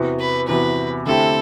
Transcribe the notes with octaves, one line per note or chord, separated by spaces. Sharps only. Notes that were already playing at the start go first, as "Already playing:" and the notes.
Already playing: E2 C3 E3 B3 F#4
B4
E2 C3 E3 B3 F#4 B4
D3 A3 C4 E4 G4 A4